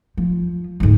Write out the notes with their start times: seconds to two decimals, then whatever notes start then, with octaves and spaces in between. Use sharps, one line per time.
0.17 F3
0.80 D2 G#2